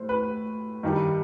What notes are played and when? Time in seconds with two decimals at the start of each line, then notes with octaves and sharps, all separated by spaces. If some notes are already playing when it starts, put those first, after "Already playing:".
Already playing: A2 C5
0.09 B4
0.83 G2 D#3 G3